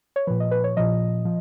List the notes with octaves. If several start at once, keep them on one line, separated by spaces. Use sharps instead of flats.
C#5
A#2 F3 B4
D#5
B4
C#5
A#2 F3 D#5
F3